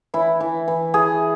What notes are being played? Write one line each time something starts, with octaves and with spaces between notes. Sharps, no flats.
E3 E4
E3
E3
E3 G#4